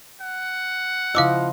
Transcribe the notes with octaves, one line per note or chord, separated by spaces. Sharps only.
F#5
C#3 F3 E4 D#5 F5 D6 E6